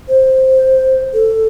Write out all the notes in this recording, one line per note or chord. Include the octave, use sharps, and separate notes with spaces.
C5
A4